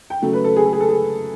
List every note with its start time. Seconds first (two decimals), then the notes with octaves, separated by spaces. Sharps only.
0.10 G5
0.22 C#3 F#3 A3
0.33 B4
0.44 A4
0.56 G#4
0.64 A4
0.73 G#4
0.80 A4
0.89 G#4